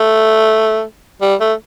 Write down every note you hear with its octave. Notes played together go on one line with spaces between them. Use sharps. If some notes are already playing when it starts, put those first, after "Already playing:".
Already playing: A3
G3
A3